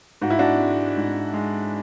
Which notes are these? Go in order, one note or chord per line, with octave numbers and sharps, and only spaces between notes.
G#2 F#4
E4
D4 F#4
G#3
G#2
G#3